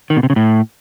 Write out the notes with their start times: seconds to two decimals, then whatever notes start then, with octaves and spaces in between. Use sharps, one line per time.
0.10 D#3
0.17 B2
0.23 C3
0.30 C#3
0.36 A2